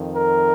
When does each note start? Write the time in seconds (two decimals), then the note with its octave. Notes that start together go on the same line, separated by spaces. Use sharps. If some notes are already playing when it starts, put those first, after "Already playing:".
Already playing: F2 D#3
0.14 A#4